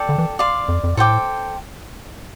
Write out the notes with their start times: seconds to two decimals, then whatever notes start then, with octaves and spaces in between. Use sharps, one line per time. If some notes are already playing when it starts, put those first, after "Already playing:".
Already playing: A4 D5 G5
0.09 D3
0.18 E3
0.39 D5 F5 C6
0.68 F2
0.84 F2
0.97 A2 A4 C5 G5 D6